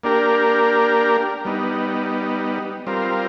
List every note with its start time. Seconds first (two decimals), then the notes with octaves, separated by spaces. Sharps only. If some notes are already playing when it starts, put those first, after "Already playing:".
0.04 A#3 D4 G4 A#4
1.45 G3 B3 D#4
2.87 G3 C4 F4 A#4